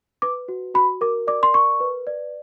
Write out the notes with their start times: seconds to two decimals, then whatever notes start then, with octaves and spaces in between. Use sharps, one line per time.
0.22 B4 D6
0.48 F#4
0.74 F#4 B5
1.01 A#4 D6
1.27 D5 D6
1.43 C6
1.53 A#4 C#6
1.80 B4
2.07 D5